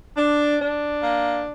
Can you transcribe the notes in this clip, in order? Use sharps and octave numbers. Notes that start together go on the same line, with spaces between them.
D4
D4
A#3